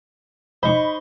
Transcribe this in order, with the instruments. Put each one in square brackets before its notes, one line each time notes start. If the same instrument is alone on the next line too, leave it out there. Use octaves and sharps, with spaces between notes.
[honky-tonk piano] D#4 D#5 B5 [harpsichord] C5 C#6